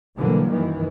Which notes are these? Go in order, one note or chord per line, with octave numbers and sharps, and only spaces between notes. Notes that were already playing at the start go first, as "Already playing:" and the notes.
B2 D3 E3 F#3 G3 A#3
F#2 D#3 E3